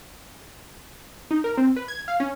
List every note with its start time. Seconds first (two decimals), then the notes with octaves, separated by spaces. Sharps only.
1.31 D#4
1.44 A#4
1.58 C4
1.76 B4
1.88 G#6
2.08 F5
2.20 C#4